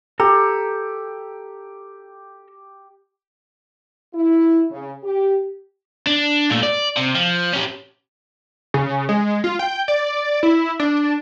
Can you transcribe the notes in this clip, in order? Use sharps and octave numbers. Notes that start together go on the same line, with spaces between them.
G4 A4 A#5
E4
C#3
G4
D4
A#2 A3
D5
C3
F3
C#4 G4
C#3
G#3
F4
G5
D5
E4
D4